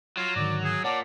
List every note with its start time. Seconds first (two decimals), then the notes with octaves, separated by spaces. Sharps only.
0.17 F#3 F4
0.36 G#2 D3 D#3 D5
0.64 G#4
0.84 A#2 C#5 D5 F#5 A5